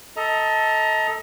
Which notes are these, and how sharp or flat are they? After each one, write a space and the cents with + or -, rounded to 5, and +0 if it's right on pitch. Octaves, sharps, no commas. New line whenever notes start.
A4 +0 D#5 +30 A#5 +0